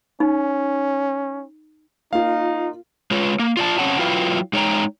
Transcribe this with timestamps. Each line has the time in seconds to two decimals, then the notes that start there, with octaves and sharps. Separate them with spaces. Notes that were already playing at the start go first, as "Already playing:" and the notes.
0.20 C#4 D#4
2.13 A#3 D#4 F4 F5
3.11 G#3 F4 B4 C#5
3.39 A#3
3.57 F4 D5 A5
3.78 C4 C#4 C#5 F#5 A5
3.99 F#3 E4 F4 B4 F5 G5
4.53 G#3 D#4 C#5 F#5 G5 A#5